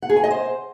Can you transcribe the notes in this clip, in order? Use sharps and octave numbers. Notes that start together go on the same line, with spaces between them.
F#5
G#4
G#5
D#5
C5